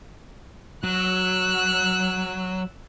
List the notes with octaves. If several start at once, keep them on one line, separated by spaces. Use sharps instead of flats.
F#3 E6 F#6